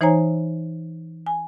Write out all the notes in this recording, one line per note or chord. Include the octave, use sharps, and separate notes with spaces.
E3 D#4 C5 C#5 G#5 A#5
G#5